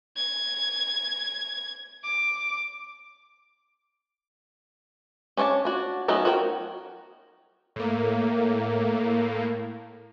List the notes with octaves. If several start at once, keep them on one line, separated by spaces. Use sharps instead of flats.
G#6
D6
C#4 D4 C#5 F5 A5
D4 F#4
F#3 A3 B3 C#4 D#4
F#4 A#4 C#5 G5
A2 A#3